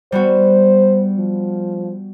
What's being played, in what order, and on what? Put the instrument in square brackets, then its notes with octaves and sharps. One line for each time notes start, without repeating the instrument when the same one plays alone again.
[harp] G3 B3 F#4 [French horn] C5
[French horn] F3